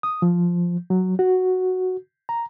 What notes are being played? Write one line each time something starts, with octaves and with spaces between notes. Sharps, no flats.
D#6
F3
F#3
F#4
A#5